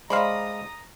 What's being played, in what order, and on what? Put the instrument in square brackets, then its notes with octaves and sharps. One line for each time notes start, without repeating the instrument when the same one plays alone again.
[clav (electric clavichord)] G#3 F5 [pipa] C5 D5 B5 [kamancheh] A#5 D#6